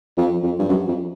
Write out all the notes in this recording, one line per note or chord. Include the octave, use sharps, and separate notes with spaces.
F2
F2
G2
F#2
F2